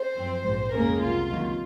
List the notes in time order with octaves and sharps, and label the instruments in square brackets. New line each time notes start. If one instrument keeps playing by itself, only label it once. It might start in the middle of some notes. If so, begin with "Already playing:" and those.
Already playing: [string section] C5
F#2 F3 C4
A#1 G#2 F3
F2 C#3 G#3 A#3 C#4 A#4
C2 C3 F#3 F4
C#2 C3 D#3 F#3 A#3